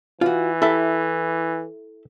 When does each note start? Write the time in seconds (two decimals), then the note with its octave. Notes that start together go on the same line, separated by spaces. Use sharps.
0.21 E3 F4 F#4
0.62 E4 G4 A4 E5